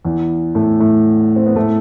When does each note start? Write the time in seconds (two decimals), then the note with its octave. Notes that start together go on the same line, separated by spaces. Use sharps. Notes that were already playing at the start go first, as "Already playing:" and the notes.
0.05 E2 E3
0.55 A2 A3
0.80 A2 A3
1.36 C4
1.46 B3
1.56 A2 A3